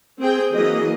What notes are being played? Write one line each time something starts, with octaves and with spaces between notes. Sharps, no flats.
C4 G#4 G5
E3 F#3 A#3 G#4 D#5